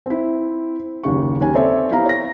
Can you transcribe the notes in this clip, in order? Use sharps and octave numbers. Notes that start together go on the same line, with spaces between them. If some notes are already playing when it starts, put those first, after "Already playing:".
C4 E4
F#1 D#2 C#3 C#6
D#2 C#4 G#5
C4 A4 C#5 D5 E5
B3 E4 G4 F5 A#5
C#5 A#6